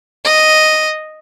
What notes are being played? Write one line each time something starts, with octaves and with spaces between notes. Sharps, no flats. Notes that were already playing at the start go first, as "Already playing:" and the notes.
D#5